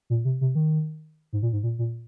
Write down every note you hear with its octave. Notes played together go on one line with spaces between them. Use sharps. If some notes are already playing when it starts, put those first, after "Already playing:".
A#2
C3
C3
D#3
G#2
A#2
G#2
A#2
A#2